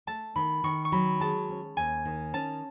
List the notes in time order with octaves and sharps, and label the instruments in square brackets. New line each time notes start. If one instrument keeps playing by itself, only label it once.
[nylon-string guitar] A3 [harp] A5
[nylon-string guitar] D#3 [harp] B5
[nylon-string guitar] D#3 [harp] C#6
[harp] C#6
[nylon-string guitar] F#3 [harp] B5
[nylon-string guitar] G#3 [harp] A5
[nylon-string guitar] C#4
[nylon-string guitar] D#2 [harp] G#5
[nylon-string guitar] D#3
[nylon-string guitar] C#4 [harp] A5